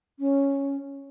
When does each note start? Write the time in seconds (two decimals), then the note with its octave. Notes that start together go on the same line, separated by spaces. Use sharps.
0.19 C#4